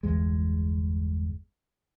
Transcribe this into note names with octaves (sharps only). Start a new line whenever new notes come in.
G1 E2 G#3